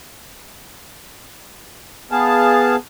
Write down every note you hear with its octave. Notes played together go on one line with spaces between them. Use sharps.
B3 G#4 F5 A5